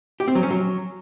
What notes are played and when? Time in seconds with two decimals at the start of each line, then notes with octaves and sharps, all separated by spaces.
0.20 G4
0.28 C4
0.35 F#3
0.43 C#4
0.51 F#3